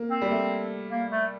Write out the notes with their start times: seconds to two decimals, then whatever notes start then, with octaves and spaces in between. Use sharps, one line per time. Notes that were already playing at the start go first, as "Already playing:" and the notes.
Already playing: A#3
0.10 C4
0.22 G3
0.31 A3
0.90 A#3
1.11 A3